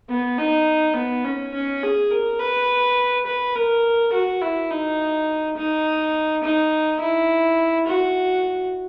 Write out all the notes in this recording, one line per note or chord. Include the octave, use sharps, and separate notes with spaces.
B3
D#4
B3
C#4
C#4
G#4
A#4
B4
B4
A#4
F#4
E4
D#4
D#4
D#4
E4
F#4